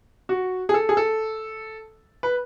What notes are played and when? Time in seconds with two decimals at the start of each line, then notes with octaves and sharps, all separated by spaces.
0.29 F#4
0.69 G#4
0.74 A4
0.89 G#4
0.97 A4
2.23 B4